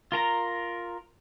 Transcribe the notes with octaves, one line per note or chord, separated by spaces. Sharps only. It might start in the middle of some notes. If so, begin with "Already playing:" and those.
F4 A#4 A#5